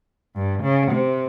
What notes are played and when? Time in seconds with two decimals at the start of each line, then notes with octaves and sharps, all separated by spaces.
0.36 G2
0.63 C#3
0.92 C3